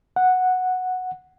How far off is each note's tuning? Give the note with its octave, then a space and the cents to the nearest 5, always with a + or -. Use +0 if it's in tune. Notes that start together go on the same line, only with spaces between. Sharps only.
F#5 -5